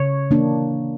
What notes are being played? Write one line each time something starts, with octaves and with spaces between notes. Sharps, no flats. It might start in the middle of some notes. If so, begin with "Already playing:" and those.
Already playing: C#3 C#5
E3 A#3 D4